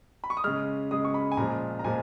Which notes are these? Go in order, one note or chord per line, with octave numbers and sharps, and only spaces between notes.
B5
C#6
D#6
C#3 G#3 F6
C#3 G#3 D#6
C#6
B5
G#5
A#2 F3 G#3 A#5
A#5
A#2 F3 G#3 G#5